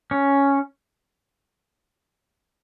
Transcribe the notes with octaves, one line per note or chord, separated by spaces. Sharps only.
C#4